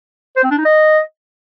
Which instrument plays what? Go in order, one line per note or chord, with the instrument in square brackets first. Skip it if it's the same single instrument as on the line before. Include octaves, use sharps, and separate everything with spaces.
[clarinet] C5
C4
D4
D#4
D#5